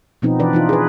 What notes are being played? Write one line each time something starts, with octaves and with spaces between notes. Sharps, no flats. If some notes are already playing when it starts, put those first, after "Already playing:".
B2 F3 B3 C4 D#4
E3 D4 B4 D5
E3 D#4 F4
G#4 B4